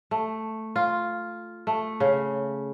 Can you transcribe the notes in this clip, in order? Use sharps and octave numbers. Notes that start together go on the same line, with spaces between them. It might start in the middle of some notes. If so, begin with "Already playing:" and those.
A3
F4
A3
C#3